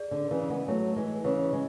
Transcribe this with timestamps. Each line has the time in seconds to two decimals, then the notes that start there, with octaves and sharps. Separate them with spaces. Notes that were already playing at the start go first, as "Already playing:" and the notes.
Already playing: G#4 D5
0.11 D3
0.31 C#3 E3
0.50 G#3 B3
0.68 F#3 A3
0.96 E3 G#3
1.24 C#3 E3
1.53 G#3